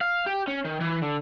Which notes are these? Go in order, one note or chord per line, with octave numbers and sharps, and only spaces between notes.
F5
G4
C#4
D#3
E3
D3